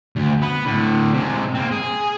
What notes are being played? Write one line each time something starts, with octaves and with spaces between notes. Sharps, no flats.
D2
B3
A2 D3
C3 G#3
A#3 C4
G#4